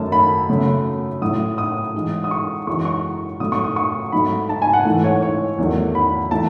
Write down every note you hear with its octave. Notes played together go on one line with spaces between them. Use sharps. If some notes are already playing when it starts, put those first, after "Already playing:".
Already playing: F#2 D#3 A3 A5
B5
F#2 C#3 F#3 A3
A2 F#3 A3 D#6
D#6
G#2 E3 G#3
D#6
C#6
F#2 E3 G#3 C#6
C#6
A2 F#3 A3 D#6
C#6
D#6
C#6
G#2 F#3 A3 B5
A5
G#5
F#5
G#2 E3 A3
C#5
C#5
E2 D#3 F#3 A3
B5
E3 A3 A5